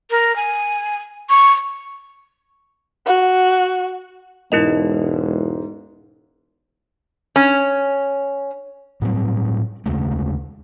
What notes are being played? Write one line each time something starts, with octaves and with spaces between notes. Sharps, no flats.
A#4
G#5
C#6
F#4
E1 G#2 E4 A#4 D#5
C#4
A2 F#3 G3 C4
D#2 C#3 G#3 A3